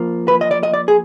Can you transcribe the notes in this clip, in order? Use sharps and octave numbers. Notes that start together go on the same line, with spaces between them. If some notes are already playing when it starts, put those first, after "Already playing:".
Already playing: F3 A#3
B4
D#5
D5
D#5
D5
G#4